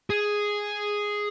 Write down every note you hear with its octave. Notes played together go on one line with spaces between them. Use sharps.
G#4